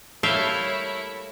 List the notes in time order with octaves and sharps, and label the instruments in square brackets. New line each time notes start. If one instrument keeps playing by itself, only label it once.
[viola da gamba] G3 C#5 [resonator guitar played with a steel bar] A3 A#3 [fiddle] E4 [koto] E5 F5 G5